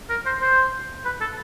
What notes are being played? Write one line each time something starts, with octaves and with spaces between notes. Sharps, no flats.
A#4
C5
C5
B4
A4